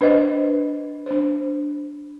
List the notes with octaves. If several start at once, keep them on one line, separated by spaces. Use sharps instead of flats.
D4 B4 C5 D#5
D4 C5